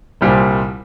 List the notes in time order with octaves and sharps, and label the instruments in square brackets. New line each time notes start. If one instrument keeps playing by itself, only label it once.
[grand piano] C2 A#2 G3 C4